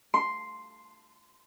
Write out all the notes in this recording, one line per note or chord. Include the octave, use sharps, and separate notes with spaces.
C6